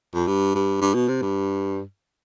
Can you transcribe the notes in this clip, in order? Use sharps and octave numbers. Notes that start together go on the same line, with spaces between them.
F2
G2
G2
G2
B2
C3
G2